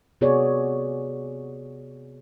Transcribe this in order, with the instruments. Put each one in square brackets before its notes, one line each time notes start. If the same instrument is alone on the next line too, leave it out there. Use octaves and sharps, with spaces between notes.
[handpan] C3 B3 F#4 G#4 C#5 D5